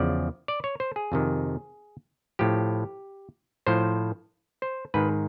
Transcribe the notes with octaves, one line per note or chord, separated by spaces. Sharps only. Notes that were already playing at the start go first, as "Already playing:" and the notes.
Already playing: E2 C#3 F3 D5
D5
C#5
C5
G#4
F2 C3 D#3
A2 F3 G4
A2 F3 C5
C5
G#2 D#3 B4